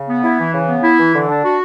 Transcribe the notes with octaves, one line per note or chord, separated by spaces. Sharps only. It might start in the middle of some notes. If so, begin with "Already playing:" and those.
Already playing: C#3
B3
E4
E3
C#3
B3
E4
E3
D3
D4
F#4